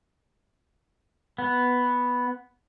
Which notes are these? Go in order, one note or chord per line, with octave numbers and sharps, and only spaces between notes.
B3